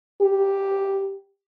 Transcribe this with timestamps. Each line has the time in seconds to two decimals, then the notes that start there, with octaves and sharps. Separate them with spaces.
0.21 G4